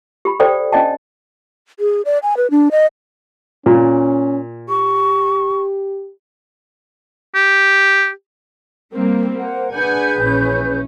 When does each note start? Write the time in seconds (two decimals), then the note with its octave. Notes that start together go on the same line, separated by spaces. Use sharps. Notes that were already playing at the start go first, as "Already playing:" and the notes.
0.25 G4 B5
0.40 A4 C5 D5 F5 G5
0.72 C#4 D4 D5 D#5 G5 A5
1.80 G#4
2.05 D5
2.23 G#5
2.37 B4
2.51 D4
2.71 D#5
3.66 A#2 C#4
4.69 G4 C#6
7.35 G4
8.94 G3 A#3 C4
9.37 A#3 C5 F#5
9.73 D4 G#4 B4 F#5 G#5 G6
10.18 A#1 E3 C#4